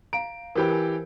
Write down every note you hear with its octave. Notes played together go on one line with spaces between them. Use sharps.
F5 A#5 D7
E3 G4 A#4 C5 G5 B5
A#4 G#5